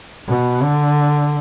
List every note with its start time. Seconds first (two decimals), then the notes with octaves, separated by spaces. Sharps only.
0.28 B2
0.63 D3